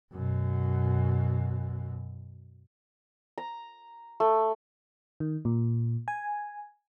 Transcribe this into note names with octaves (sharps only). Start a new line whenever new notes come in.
F#2 B2
A#5
A3
D#3
A#2
G#5